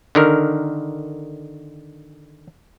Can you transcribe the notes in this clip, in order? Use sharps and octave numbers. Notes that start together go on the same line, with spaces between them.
D3 D#3 A#4